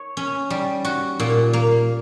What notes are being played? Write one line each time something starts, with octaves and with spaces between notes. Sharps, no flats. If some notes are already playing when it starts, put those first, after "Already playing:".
Already playing: C#5
C#4
G3
F#4
A#2
A#3